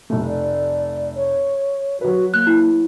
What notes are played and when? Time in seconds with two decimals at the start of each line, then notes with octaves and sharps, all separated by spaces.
0.10 F1 F#3 A3
0.26 D5
1.15 C#5
2.01 F#3 F#4 B4
2.34 A#3 F#6
2.47 E4